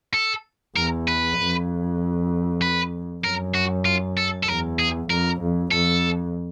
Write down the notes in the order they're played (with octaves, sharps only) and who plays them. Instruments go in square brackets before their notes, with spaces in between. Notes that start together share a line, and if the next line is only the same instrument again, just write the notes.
[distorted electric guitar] A4
[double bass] E2 [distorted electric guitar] A#4
[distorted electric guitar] B4
[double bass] F2
[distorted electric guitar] B4
[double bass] F#2 [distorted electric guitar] A#4
[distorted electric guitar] F#4
F4
A4
A4
[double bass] E2 [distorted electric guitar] A#4
[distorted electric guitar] G#4
[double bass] F2 [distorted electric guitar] A#4
[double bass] F2
[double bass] F2 [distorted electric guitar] A4